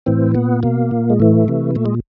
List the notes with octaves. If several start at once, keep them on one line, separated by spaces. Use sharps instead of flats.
A2 E3 C4
A#2 B3
B2 A#3
A#2
G#3
A2 E3 A3
C3 E3
A#2 A3
G#3